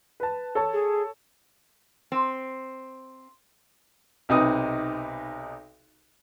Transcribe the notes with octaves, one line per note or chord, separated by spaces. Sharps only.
B4 A5
A4 C#5 A5
G#4
C4
B1 C3 D#4 B4 D#6